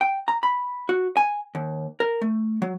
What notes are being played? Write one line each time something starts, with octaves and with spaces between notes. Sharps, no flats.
G5
A#5
B5
F#4
G#5
D#2
A#4
A3
F#3